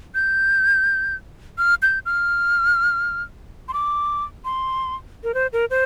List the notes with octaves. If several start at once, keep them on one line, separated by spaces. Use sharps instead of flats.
G6
F6
G6
F6
C6
D6
C6
A#4
C5
A#4
C5